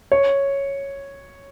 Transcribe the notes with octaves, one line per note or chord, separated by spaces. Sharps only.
C#5